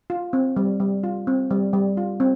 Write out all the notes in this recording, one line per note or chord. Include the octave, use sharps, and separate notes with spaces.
F4
C4
G3
G3
F4
C4
G3
G3
F4
C4